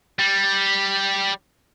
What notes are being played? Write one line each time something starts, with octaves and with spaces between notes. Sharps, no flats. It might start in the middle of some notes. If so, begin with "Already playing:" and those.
G3